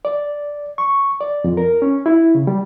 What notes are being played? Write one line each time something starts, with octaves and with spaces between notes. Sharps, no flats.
D5
C#6
D5
F2
A#4
C#4
E4
C#3
G3